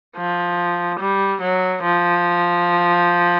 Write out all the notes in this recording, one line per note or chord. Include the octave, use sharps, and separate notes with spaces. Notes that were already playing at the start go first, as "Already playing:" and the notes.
F3
G3
F#3
F3